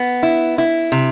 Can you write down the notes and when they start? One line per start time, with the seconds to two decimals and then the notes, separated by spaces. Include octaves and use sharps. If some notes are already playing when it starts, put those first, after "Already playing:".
Already playing: B3
0.23 E4
0.58 E4
0.92 C3